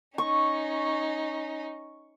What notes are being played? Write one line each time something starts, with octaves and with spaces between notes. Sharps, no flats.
C#4 D#4 C#6